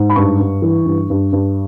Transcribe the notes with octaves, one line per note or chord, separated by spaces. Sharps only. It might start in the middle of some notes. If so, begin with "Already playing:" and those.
Already playing: G#2
B5
G2 C#6
G2
E3
G2
G2
G2